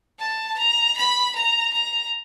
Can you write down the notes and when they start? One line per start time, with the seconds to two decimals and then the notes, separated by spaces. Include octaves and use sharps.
0.20 A5
0.58 A#5
0.97 B5
1.35 A#5
1.73 A#5